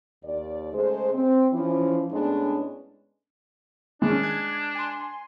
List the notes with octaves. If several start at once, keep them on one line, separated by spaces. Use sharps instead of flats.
D#2 D5
C#3 G#3 A3 G#4 C5
C4
E3 F3 C#4
A2 G#3 B3 C#4 D4
D#3 G#3 C#4 D4
F#6 G#6
G#5 C6